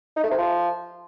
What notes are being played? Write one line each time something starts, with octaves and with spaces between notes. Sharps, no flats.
D#4
A3
C3
F3